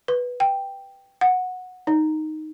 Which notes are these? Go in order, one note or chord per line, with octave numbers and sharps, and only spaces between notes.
B4
G5
F#5
D#4